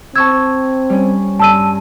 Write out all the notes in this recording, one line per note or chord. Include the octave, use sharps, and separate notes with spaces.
C4 A5 C#6 E6 G#6
G3 C#4
G2 A5 E6 D#7